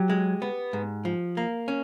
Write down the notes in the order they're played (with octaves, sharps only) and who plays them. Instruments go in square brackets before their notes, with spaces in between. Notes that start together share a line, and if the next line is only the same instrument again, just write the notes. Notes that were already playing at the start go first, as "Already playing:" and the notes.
Already playing: [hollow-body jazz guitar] F#3 [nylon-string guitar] G4
[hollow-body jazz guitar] G#3
B3
G#2
F3
A#3
C#4